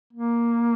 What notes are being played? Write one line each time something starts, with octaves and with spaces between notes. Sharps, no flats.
A#3